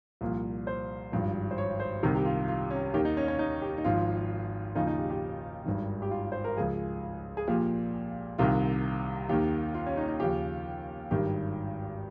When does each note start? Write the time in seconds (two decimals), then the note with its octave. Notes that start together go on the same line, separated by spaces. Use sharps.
0.21 C2 A#2 F3
0.67 C5
1.12 G#1 G2 F3
1.51 C5
1.58 C#5
1.80 C5
2.03 C2 C3 D#3
2.16 G4
2.25 F4
2.48 F4
2.70 C#4
2.94 D#2 D#3 G4
3.05 D#4
3.17 C#4
3.28 C#4
3.39 D#4
3.62 G4
3.78 D#4
3.84 G#1 G#2 F3 F4
4.75 D#2 C#3 F3 D#4
4.87 D#4
4.98 G4
5.10 G4
5.66 G#1 G2 D#3
6.02 G4
6.11 F4
6.32 C5
6.44 A#4
6.57 C#2 C#3 F3 G#4
7.37 G#4
7.47 A#1 A#2 F3 G4
8.38 C2 C3 D#3 F4
9.29 D#2 D#3 G4
9.74 F4
9.86 C#4
9.97 D#4
10.08 D#4
10.20 D#2 C#3 F3 G4
11.11 G#1 G2 D#3 G4